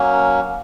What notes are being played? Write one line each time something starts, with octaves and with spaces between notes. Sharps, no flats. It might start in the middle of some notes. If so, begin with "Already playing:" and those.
Already playing: F#3 A#3 C#4